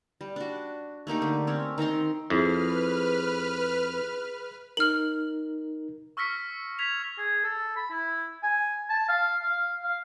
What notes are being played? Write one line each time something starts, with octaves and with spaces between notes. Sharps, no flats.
G3
D4 F#4
A3 A#3 D#4 G4
D3
C4 C#4 C#5
D#3 C4 A#5 C6
F2 E4 G#4 B4 F6
D#4 A#4 F6 F#7
C#6 E6 F6 A#6 B6 C#7
G#6 B6 F7
G#4
A4
B5
E4
G#5
A5
F5
F5
F5